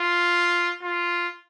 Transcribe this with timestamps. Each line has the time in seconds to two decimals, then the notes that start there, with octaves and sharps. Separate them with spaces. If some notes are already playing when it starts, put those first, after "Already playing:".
Already playing: F4
0.82 F4